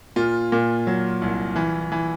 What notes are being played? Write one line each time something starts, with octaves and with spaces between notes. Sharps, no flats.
A#2 F4
A#2
F#3
C2
E3
E3